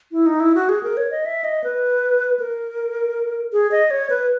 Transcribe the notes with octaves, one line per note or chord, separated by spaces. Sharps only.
E4
D#4
E4
F#4
G#4
A#4
C#5
D#5
E5
D#5
B4
A#4
G#4
D#5
C#5
B4